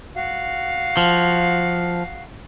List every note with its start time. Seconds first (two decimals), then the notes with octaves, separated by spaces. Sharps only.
0.13 F#4 F5
0.97 F3